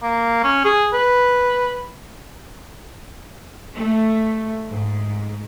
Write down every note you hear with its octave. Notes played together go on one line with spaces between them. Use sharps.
A#3
C#4
G#4
B4
A3
G#2